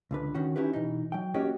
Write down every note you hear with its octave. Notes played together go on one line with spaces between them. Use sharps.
C#2 D3 B4
D#3 C#4 F#4
C#4 D#4 E4 G4 B4
B2 E3 D#4
F#3 G5
A#3 C#4 F#4 G4 C#5 D#5